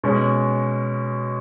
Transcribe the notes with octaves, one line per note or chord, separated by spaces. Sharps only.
B2 G#3 C#4